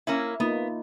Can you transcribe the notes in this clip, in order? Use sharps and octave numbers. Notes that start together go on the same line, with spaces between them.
A#3 C#4 E4
A#3 B3 D#4 F4